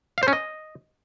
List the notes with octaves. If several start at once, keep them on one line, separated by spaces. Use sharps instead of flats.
F5
C5
C#4
D#5